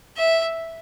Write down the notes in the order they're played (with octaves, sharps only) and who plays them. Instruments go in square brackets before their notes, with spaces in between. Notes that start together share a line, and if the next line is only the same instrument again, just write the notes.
[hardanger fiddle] E5